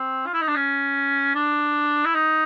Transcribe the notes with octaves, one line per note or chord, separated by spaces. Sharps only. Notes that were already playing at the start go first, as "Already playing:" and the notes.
Already playing: C4
F4
E4
D#4
D4
C#4
D4
E4
D#4